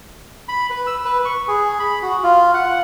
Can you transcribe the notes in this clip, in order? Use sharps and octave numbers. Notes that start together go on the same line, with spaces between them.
B5
B4
E6
B4
C#6
G#4
B5
F#4
F4
F#5